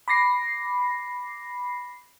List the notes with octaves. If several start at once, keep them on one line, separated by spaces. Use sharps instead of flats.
B5 D6 A#6 C7